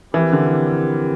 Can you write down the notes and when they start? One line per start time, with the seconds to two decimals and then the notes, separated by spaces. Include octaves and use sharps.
0.13 E3 F3 C4 E4 G4 A#4
0.33 D3